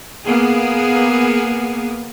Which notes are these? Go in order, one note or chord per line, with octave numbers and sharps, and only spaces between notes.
A#3 B3 G#4